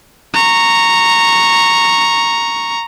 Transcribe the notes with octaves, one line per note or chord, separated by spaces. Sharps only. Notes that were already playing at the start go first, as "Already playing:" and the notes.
A#5 C#6